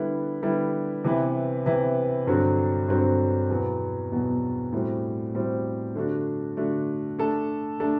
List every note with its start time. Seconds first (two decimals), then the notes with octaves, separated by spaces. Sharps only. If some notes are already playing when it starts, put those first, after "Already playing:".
Already playing: D3 G3 B3 E4
0.42 D3 G3 B3 E4
1.04 C3 E3 B3 E4 B4
1.66 C3 E3 B3 E4 B4
2.27 G2 D3 F#3 C4 F#4
2.88 G2 D3 F#3 C4 F#4
3.49 E2 B2 F#3 B3
4.12 E2 B2 F#3 B3
4.73 A2 G3 C4 F#4 C5
5.34 A2 G3 C4 F#4 C5
5.95 D3 A3 D4 F#4
6.57 D3 A3 D4 F#4
7.19 A3 D4 A4
7.80 A3 D4 A4